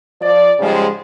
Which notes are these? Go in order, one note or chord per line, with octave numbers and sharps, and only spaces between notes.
F3 D5
G#2 C#3 F3 G3 G#3